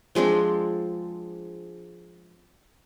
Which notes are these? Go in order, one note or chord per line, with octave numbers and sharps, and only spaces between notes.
F3 G#3 C4 D4